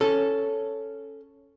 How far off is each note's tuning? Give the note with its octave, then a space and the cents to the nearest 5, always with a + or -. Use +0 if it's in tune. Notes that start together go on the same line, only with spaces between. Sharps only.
C#4 +0 A4 +0